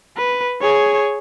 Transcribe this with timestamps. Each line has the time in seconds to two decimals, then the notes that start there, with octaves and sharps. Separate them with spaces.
0.17 B4
0.61 G#4 C#5